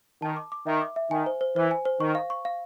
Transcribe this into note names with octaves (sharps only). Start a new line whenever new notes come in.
D#3 A5
D6
D6
D#3 E5
D6
E5
D#3 G#5
C5
C5
E3 C5
G#5
C5
D#3 C#6
F5
C#6
F5